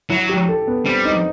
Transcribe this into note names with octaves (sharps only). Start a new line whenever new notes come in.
F#3 E4
G4
A4
B3
G3 C4
D#4